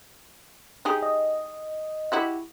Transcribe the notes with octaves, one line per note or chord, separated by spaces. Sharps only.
D#4 G4 G#4
D#5
E4 F#4 G4